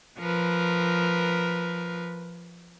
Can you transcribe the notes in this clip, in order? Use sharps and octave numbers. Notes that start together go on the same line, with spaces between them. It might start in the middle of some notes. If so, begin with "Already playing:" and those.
F3 A#4 B4